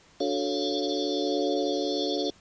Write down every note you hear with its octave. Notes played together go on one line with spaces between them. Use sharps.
D4 F#4 A4 C#5 F5